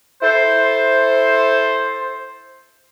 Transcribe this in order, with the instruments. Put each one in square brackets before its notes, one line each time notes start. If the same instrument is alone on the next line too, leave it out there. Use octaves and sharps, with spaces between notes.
[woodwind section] E4 A4 C5